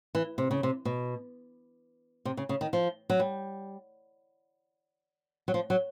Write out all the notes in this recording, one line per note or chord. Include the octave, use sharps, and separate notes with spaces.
E3
C3
C#3
C3
B2
C3
C#3
C#3
D#3
F3
F#3
G3
F#3
F3
F#3